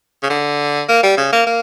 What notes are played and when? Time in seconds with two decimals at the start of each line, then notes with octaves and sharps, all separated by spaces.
0.23 C#3
0.30 D3
0.89 A#3
1.03 G3
1.17 C#3
1.33 A#3
1.47 A#3